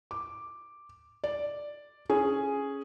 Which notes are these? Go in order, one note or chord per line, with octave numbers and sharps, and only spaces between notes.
D6
D5
C#4 G#4